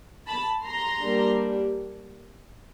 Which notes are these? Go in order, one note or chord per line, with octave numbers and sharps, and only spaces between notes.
A5 B5
A#5 C6
G3 A#3 D4